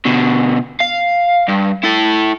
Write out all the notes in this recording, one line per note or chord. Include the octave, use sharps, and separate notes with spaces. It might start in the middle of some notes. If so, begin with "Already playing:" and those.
B2 D3
F5
G2
E4 A4